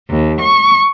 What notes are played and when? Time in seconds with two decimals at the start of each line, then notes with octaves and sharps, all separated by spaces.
0.10 D#2
0.43 C#6